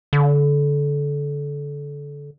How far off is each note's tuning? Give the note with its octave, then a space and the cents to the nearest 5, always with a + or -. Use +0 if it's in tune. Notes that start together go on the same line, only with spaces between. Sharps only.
D3 -25